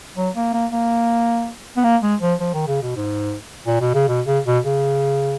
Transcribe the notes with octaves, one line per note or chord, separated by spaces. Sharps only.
F#3
A#3
A#3
A#3
B3
A#3
G#3
F3
F3
D#3
C#3
B2
G#2
A#2
B2
C#3
B2
C#3
B2
C#3